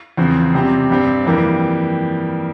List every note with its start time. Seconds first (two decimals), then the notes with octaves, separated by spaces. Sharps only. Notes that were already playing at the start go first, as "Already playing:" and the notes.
0.17 E2 C#3 F3 C4
0.54 C3 G3 C4 G4
0.90 G2 G3 C4
1.25 F2 E3 G3 A#3